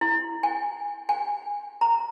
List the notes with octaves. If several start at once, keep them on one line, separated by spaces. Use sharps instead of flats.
E4
G#5
G#5
A#5